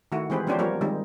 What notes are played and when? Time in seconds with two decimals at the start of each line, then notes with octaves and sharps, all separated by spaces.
0.12 D#3 A3 E4 F#4
0.30 E3 G#3 C4 G4 G#4 B4
0.47 F3 B3 C#4 D4 G4 C5
0.59 F3 G3 A#3 A#4 C#5
0.81 D#3 G3 G#3 C4 D#4